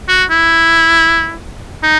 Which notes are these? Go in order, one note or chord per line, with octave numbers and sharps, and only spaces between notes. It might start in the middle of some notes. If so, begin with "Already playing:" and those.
F#4
E4
D#4